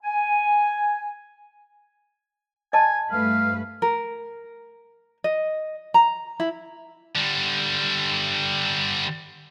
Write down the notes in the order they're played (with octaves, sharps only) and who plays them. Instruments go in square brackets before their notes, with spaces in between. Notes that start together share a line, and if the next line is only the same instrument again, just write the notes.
[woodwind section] G#5
[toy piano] D#5 A5 [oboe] G#5
[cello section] G2 A3 B4 [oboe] F5
[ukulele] A#4
D#5
A#5
E4
[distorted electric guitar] D3 G3